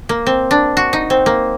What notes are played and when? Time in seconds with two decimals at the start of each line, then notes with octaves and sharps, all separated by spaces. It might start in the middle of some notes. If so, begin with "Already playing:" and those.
0.09 A#3
0.26 C4
0.51 D4
0.77 F#4
0.93 D#4
1.10 C4
1.26 A#3